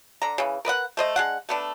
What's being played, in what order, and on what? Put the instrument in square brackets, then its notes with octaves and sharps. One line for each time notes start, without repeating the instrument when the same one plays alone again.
[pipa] D3 A#5
C#3 E3
A#4 B4 D#5 F#5
A3 C5 D#5
G#3 D4 F#5
A3 B3 D4